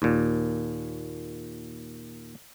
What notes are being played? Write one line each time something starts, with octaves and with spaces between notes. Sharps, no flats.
D#2 A#2